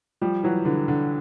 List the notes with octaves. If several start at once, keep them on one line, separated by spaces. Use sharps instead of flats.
F3 G3
E3 F#3
D3 E3
D3